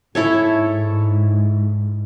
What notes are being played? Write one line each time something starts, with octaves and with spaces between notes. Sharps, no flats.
G#2 E4 A4 C#5